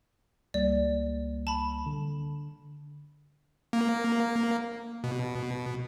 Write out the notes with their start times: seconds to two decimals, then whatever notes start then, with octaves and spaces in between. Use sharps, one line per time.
0.54 C#2 G3 A#3 D5
1.47 A5 B5
1.86 D3
3.73 A#3
5.04 B2